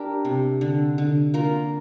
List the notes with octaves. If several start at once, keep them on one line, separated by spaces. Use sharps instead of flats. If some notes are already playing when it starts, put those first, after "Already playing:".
Already playing: D4 G4 A#4
C3
D3
D3
A#3 F4 A#4